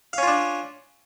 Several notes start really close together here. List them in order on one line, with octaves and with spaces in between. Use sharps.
F5 C#4 F4 D4